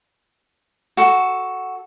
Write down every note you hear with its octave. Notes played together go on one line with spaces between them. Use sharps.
F#4 A4